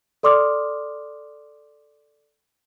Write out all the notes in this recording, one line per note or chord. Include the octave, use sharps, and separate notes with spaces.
A4 D5 C6 D6 D#6 F6